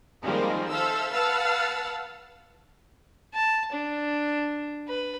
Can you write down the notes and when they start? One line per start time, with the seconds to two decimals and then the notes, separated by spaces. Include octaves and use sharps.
0.23 D#3 F3 G3 G#3 A#3 C4
0.72 A4 C5 E5 F5 E6
1.12 B4 F5 F#5 A5 E6 A6
3.34 A5
3.72 D4
4.88 B4